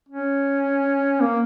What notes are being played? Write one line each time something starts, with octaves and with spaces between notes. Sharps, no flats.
C#4
A#3